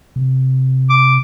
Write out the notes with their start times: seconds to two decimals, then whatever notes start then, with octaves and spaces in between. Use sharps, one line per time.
0.16 C3
0.90 D6